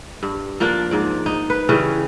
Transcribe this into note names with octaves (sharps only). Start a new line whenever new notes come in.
G2
F3 A#3 D4 D5
G#2 D5
D#4
B4
C#3 E3 G3 C#4